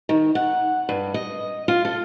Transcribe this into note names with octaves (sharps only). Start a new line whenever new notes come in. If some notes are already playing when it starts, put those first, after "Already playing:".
D#3
F#5
G2
D#5
F4
A4